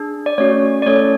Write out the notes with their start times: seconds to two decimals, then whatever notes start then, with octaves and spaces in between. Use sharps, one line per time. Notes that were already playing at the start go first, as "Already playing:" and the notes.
Already playing: D4 G#4
0.26 D5
0.38 A3 C#4 F#4 C#5
0.82 D5
0.86 A3 C#4 E4 A4 C#5